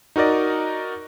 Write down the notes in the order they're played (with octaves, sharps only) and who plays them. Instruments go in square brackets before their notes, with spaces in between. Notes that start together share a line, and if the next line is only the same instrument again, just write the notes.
[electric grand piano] D#4 F#4 A#4 D5 D#5